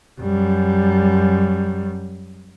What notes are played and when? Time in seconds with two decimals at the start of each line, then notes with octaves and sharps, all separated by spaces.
0.20 F#2 G3